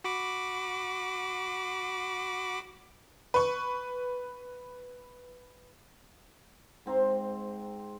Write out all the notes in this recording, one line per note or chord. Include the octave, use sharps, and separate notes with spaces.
F#4 B5 D6
B4 C#6
G#2 C4 A#5 C6